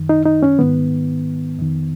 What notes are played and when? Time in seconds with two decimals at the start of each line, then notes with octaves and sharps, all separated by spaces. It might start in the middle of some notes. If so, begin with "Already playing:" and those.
Already playing: F#2 D#3
0.09 D#4
0.26 D#4
0.43 C#4
0.59 G#2 D#3 B3
1.59 F2 D#3